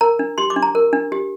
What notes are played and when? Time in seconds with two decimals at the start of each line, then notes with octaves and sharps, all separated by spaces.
0.01 A#4 A#5
0.19 D4
0.38 G4 C6
0.50 D6
0.56 D4
0.63 A#5
0.75 A#4
0.93 D4
1.12 G4